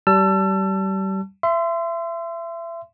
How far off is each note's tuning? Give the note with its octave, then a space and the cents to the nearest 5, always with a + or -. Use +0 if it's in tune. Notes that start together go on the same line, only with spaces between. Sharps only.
G3 -30 A5 +0 E6 +35
E5 +30 C6 -20